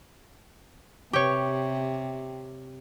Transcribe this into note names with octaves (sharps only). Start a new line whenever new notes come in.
C3 G4 C#5